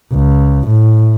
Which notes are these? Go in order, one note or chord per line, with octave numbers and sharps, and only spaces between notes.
C#2
A2